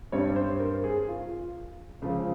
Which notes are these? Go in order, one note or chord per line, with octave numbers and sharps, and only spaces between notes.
G2 G3 C4 C#5
C5
A#4
G#4
F4
C#2 C#3 F3